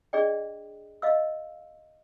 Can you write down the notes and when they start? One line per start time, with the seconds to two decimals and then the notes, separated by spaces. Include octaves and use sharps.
0.13 D4 G#4 D5 D#5 G5
1.02 D#5 F5 E6